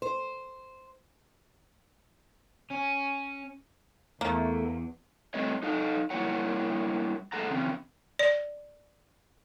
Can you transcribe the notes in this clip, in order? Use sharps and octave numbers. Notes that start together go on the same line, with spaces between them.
C5
C#4
E2 A3 A#3
G3 A3 C4 A4 C#5 D#5
D#4 A4 F5
G3 A#3 E4 A#4 C#5 F#5
A#2 G#3 A4 F#5 A#5
C#3 E3 C4 C#4
D5